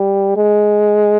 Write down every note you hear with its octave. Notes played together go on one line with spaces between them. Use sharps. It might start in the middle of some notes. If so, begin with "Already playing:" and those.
Already playing: G3
G#3